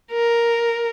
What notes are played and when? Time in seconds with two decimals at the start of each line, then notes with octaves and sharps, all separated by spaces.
0.12 A#4